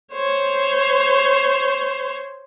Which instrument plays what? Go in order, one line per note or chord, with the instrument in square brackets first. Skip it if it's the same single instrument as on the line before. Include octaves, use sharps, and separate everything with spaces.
[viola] C5 C#5